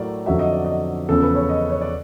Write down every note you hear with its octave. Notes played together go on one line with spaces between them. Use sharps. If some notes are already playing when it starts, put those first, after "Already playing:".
Already playing: A2 F#3 A3 A#4 D5
F2 D3 F#3 E5
D#5
D5
D#5
E2 C#3 F3 A4
B4
C#5
D#5
C#5
D5